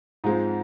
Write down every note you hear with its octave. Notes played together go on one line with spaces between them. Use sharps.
G#2 F3 G#3 C4 D#4